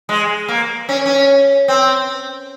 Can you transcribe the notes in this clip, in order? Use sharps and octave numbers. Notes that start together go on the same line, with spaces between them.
G#3
A#3
C#4
C#4
C4